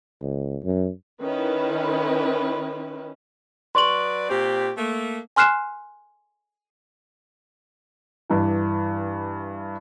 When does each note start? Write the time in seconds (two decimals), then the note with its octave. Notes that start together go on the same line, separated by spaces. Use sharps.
0.22 C#2
0.63 F#2
1.22 D#3 C#4 E4 B4
3.75 F#3 B4 D5 C6 C#6 F#7
4.29 A#2 C4 G4
4.78 A3 A#3
5.36 G#5 C6 F6 F#6 C7 E7
8.30 G2 E3